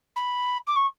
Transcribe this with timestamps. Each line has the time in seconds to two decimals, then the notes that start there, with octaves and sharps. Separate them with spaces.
0.16 B5
0.67 D6
0.76 C#6